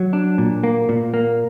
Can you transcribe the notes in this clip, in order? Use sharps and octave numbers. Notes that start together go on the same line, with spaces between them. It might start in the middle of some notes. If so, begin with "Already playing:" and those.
Already playing: F#3
D4
A#2
A#3
A#2
A#3